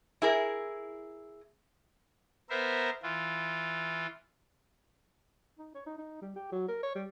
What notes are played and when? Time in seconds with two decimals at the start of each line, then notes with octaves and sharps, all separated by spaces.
0.22 E4 G#4 A#4
2.50 B3 A#4 C5 E5
3.03 E3 F4
5.58 D#4
5.75 C#5
5.86 D#4
5.98 D#4
6.21 G3
6.36 G4
6.52 F#3
6.68 A#4
6.83 C#5
6.95 G3